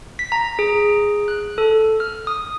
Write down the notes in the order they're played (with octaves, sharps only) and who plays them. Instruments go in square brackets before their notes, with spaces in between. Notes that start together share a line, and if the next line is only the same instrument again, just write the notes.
[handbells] B6
A#5
G#4
F#6
A4
F6
D#6